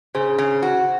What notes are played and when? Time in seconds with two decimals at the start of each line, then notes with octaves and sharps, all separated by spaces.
0.15 C#3 G#4 C5
0.38 C#3
0.63 F#4